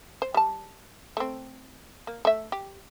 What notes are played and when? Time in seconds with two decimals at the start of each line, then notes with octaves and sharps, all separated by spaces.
0.22 C5
0.34 G3 A5
1.17 A3 C4
2.07 A#3
2.25 A3 E5
2.52 G4